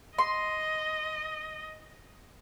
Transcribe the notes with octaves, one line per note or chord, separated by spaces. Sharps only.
D#5 C6